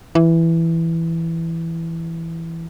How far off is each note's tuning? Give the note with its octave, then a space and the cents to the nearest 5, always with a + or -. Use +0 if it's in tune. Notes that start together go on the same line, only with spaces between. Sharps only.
E3 +5